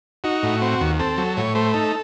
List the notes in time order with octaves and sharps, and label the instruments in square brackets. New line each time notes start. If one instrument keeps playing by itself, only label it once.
[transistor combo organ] D#4 F#4
A2
C4
D#2
C4 A4
F#3
A2 C#5
A3 C5
D#4 A4